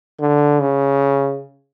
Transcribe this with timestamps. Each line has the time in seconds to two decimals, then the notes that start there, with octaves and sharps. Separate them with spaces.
0.20 D3
0.60 C#3